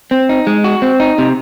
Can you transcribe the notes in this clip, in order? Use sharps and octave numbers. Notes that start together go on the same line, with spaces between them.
C4
D#4
G#3
F#4
C4
D#4
C3